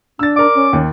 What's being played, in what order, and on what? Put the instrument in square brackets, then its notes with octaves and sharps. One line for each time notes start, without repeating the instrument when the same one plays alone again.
[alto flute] D4 [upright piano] E6 A6
[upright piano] A#4 D5 [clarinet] D6
[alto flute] C#4
[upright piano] D#2